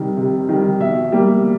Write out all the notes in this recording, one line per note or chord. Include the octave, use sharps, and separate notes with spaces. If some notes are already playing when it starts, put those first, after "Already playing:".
Already playing: C3 D#3 G3
C3
D#3 G3
B2 E5
G3 A#3